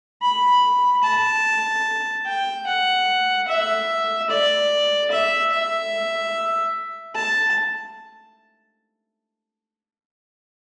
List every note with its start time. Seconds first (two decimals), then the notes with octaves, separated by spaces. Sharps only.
0.22 B5
1.04 A5
2.26 G5
2.67 F#5
3.48 E5
4.30 D5
5.11 E5
5.52 E5
7.15 A5